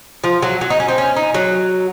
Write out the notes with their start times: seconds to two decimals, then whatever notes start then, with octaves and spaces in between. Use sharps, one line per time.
0.24 F3
0.42 F#3
0.61 F#3
0.70 D#4
0.80 C#4
0.88 C4
0.98 C#4
1.16 D#4
1.34 F#3